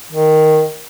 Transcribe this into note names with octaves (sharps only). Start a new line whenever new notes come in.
D#3